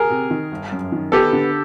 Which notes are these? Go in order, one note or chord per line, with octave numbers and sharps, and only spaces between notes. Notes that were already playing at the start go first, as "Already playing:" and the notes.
Already playing: G#4 A#4
C3
D#3
G1
F#2
D#3
B3 G4 A4
D3